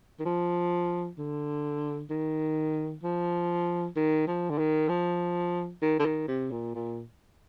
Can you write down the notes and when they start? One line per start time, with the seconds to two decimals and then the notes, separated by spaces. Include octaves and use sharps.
0.19 D#3
0.25 F3
1.18 D3
2.10 D#3
3.03 F3
3.96 D#3
4.27 F3
4.50 D3
4.58 D#3
4.89 F3
5.82 D#3
5.99 D3
6.05 D#3
6.28 C3
6.51 A#2
6.75 A#2